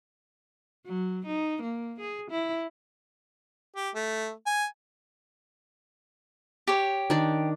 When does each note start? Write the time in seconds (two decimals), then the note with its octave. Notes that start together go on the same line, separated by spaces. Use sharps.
0.86 F#3
1.26 D#4
1.62 A#3
2.00 G#4
2.31 E4
3.76 G4
3.95 A3
4.47 G#5
6.67 G4 C#5
7.10 D#3 D4 D5